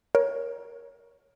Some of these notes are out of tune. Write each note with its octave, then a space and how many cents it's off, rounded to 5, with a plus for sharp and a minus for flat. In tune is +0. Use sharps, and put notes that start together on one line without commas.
A#4 +20 C#5 +0